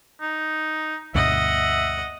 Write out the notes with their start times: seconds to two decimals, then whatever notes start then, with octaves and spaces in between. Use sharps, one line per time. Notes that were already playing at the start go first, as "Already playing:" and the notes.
0.21 D#4
1.15 D2 G2 B2 D#5 E5 F#5